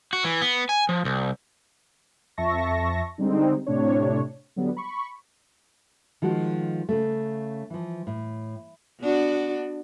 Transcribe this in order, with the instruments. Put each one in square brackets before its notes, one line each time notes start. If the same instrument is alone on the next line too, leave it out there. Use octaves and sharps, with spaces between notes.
[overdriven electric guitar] F#4
E3
B3
G#5
F3
C2
[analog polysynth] F2 E5 A5 C#6 A#6
D3 G3 G#3 C4 D#4
A2 C3 D4 C#5
D3 F#3 G3 B3
B5 C#6
[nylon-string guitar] D#3 F3 G#3 F#4
C#3 A3
E3 F3
A2
[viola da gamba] B3 D4 F#4